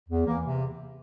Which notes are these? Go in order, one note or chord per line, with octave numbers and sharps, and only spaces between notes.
E2
E3 A#3
C3